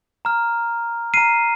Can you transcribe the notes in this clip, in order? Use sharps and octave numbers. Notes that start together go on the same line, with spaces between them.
A#5 F6
A#5 F6 C7 D#7